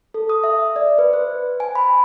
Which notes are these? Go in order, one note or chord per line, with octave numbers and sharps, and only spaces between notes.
A4
D#6
E5
D5
B4
C5
G#5
B5